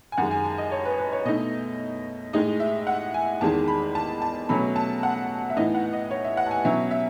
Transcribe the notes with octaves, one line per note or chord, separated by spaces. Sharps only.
G#5
F#2 D#3 G#3 F#5
G#5
A5
D#5
C#5
B4
B4
C#5
B2 A3 D#4 D#5
A2 G#3 D#4 D#5
E5
F#5
G#5
E2 D#3 G#3 A5
B5
A5
A5
B2 F#3 A3 C#4 B5
A5
F#5
E5
A2 E3 B3 D#4 D#5
F#5
D#5
C#5
E5
F#5
A5
G#5
B2 F#3 C#4 E5
E5